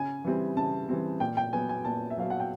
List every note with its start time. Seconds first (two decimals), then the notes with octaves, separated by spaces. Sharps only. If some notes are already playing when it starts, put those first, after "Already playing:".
Already playing: C#3 G#5
0.24 E3 G3 C4
0.57 C#3 A5
0.89 E3 G3 C4
1.20 A#2 G5
1.37 G5
1.53 F#3 B3 G#5
1.69 G#5
1.84 A#2 A5
2.10 E5
2.18 F#3 B3 F5
2.30 F#5
2.40 G5